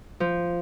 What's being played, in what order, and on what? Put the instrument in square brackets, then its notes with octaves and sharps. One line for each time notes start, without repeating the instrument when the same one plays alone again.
[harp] F3